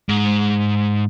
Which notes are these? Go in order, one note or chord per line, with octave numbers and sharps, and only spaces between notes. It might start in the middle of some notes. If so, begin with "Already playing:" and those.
G#2